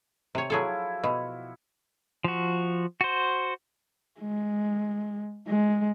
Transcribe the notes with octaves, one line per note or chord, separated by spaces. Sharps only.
C3 C#5
F3 F#3 E4 F#4 G#4 A4
B2
F3 F#4
F#4 C5
G#3
G#3